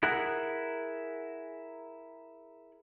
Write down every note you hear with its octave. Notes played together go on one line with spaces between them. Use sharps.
E4 G#4 A#4 F#5